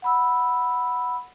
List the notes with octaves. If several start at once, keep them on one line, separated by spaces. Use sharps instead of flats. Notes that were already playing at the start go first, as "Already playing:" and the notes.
F#5 B5 E6